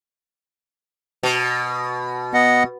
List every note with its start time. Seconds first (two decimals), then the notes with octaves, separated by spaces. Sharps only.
1.23 B2
2.34 B3 D#5 F#5